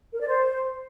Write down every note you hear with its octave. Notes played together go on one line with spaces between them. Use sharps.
A#4
D5
C5